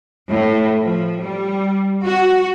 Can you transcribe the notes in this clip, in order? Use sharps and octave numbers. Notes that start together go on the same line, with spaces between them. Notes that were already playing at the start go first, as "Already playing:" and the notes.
A2
F3
G3
F#4